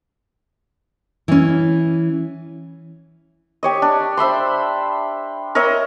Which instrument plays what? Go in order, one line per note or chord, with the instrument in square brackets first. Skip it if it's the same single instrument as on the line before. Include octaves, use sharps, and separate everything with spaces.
[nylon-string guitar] E3 C#4
[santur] G4 C#5 D#5
D4
C5 E5 B5 C6
A#4 C#5 D#5 E5